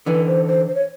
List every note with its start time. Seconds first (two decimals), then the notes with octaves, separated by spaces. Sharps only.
0.06 D3 E3 B4
0.27 C5
0.47 C5
0.68 C5
0.75 C#5